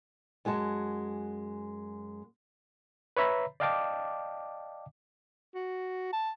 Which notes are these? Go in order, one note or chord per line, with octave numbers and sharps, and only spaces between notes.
F#2 G#3 F#4 A5
B4 C#5 E5 A#5 B5
D5 D#5 F5 G5 A5 D6
F#4
A5